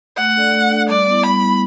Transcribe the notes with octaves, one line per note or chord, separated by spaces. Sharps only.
A3 F#5
D4 A4 D5
A3
D4 A4 D5
G3 D5
B3 E4
G3 B5
B3 E4